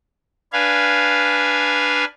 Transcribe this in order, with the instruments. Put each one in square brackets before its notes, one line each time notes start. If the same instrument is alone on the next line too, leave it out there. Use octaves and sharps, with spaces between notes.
[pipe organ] D4 B4 F5 G#5